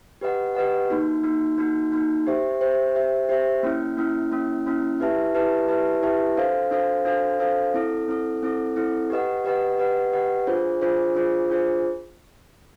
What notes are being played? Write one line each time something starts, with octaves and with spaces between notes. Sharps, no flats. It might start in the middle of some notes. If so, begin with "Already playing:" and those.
G4 B4 D#5 F#5
G4 B4 D#5 F#5
A#3 D#4 F#4
A#3 D#4 F#4
A#3 D#4 F#4
A#3 D#4 F#4
G4 C5 E5
G4 C5 E5
G4 C5 E5
G4 C5 E5
A#3 C#4 E4
A#3 C#4 E4
A#3 C#4 E4
A#3 C#4 E4
E4 G4 B4 E5 A5
E4 G4 B4 E5 A5
E4 G4 B4 E5 A5
E4 G4 B4 E5 A5
D4 F#4 A4 C5 F5
D4 F#4 A4 C5 F5
D4 F#4 A4 C5 F5
D4 F#4 A4 C5 F5
C4 E4 A4
C4 E4 A4
C4 E4 A4
C4 E4 A4
G4 B4 D#5 F#5
G4 B4 D#5 F#5
G4 B4 D#5 F#5
G4 B4 D#5 F#5
D4 F4 G#4 C5
D4 F4 G#4 C5
D4 F4 G#4 C5
D4 F4 G#4 C5